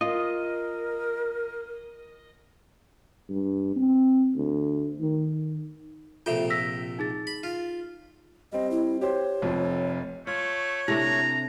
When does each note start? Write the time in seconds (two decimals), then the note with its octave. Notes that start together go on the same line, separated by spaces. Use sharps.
0.01 F4 A#4 D#5
3.29 G2
3.76 C4
4.36 D2
5.01 D#3
6.26 A#1 C3 F4 A4 E5 G5
6.50 E6 A#6 B6
6.99 D#4 G#4 A6
7.27 B5
7.43 F4
8.52 G3 C4 D#5
8.71 E4
9.01 G4 C5 C#5
9.42 F1 F2
10.27 A3 F4 C#5
10.88 C3 A3 D4 E4 A#5